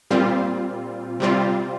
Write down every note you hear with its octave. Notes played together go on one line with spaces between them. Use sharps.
A#2 G3 C4 F4
C3 G3 C4 F4